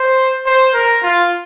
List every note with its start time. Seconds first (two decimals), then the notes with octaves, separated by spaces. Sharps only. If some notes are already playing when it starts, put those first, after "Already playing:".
Already playing: C5
0.46 C5
0.74 A#4
1.03 F4